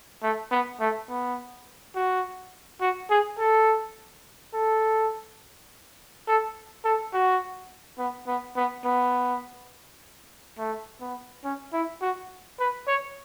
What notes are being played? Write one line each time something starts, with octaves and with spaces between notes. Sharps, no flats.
A3
B3
A3
B3
F#4
F#4
G#4
A4
A4
A4
A4
F#4
B3
B3
B3
B3
A3
B3
C#4
E4
F#4
B4
C#5